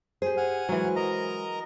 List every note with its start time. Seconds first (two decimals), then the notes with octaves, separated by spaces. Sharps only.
0.22 G4 G#4 C5
0.37 F#5 G#5 F6
0.69 E3 F#3 G#3
0.96 A#4 D#5 A#5